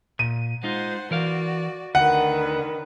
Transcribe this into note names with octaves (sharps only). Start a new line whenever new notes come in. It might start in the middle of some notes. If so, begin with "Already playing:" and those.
A#2 D#7
G#3 D#4 F4 C5 F#5
E3 F#4 A#4 D5 F5
D2 D3 D#3 B4 F#5